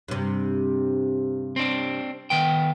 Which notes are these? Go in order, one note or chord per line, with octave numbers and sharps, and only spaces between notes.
G2 C3
C4 D4
D#3 B3 G5